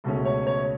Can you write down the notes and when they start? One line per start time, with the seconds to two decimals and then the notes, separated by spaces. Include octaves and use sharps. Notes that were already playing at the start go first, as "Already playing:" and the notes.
0.04 C#2 B2 A3 C#4
0.25 C#5
0.47 C#5